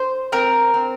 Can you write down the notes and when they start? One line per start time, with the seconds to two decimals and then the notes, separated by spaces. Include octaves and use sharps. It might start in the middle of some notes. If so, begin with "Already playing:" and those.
Already playing: C5
0.32 C4 A#4
0.74 C4